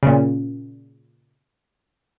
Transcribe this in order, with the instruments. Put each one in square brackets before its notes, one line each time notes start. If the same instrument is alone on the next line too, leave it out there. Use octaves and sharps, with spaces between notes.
[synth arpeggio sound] A#2 C#3